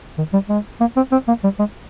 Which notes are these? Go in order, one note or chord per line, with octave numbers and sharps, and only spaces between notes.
D#3
G3
G#3
A#3
C4
C4
A#3
G3
G#3